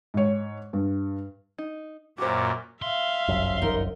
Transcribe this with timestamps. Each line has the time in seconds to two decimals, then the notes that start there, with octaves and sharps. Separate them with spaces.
0.14 G#2 C#5
0.73 G2
1.58 D#4
2.18 F#2 A#2 F#4 C5 D6
2.82 E5 F5 C6
3.28 G1 C2 F#2
3.62 D#4 A#4